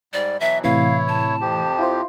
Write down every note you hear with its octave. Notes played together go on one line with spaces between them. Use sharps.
G#2 G3 D5
B2 E3 F#3 E5
A2 C3 E3 E4 C#5 F5
A5
F2 F3 G4
E4 F4 C5